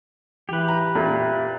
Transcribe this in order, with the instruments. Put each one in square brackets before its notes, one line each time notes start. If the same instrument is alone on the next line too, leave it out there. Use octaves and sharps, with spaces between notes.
[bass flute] E3 [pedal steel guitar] G4 B4
[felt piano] A#5
[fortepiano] A#2 [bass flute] E5